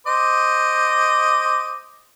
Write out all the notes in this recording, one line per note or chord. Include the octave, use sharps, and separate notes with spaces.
C5 D#5 D6